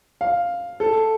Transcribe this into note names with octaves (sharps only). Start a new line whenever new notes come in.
F5
A4